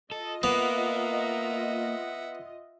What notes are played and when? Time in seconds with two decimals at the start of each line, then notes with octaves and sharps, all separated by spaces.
0.12 F4 A4 D#5
0.43 A#3 B3 E5 F#5